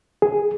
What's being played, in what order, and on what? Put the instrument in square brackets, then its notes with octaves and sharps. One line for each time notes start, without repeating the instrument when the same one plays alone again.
[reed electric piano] G#4